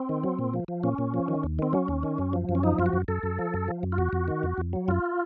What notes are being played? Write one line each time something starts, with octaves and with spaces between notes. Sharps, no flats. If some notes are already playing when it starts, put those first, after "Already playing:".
Already playing: C4
D#3
F#3
A#2
F3
F3
A#2 C#4
A#2
F3
D#3
D#2
D#3 C4
F#3 C#4
D#2
D#3
F#2
F3
F#2
C#4
F3 D#4
F#2 F4
F#4
F#2
F#2 A4
F#2
F3
F#2
F3
F#2
F4
F2 F#4
F2
D#3
F2
F2
F#3
F#2 F4